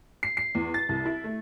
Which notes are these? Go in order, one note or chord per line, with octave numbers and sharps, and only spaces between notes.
C7
C7
E2
A6
C2
E4
A3